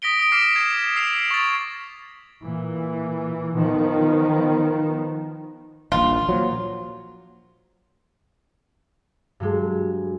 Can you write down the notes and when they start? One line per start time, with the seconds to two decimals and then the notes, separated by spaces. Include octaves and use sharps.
0.02 D#6 A#6 B6 D7 G7
0.19 D#6 D7
0.32 D6 F6 A#6 C7 E7
0.56 G#6
0.96 E6 C7 F7
1.31 C#6 A6
2.43 A#2 E3
3.54 D#3 F3 B3
5.92 D#1 A#1 F4
6.29 A#2 F3 F#3
9.40 G2 F#3 G#3